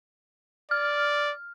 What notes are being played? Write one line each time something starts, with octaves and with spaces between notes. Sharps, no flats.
D5 F6